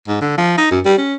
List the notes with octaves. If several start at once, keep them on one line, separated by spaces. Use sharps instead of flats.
G#2
D3
F3
D#4
F#2
G3
C#4